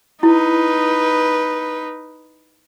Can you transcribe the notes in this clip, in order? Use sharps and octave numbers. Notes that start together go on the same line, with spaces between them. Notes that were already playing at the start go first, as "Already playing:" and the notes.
D#4 E4 B4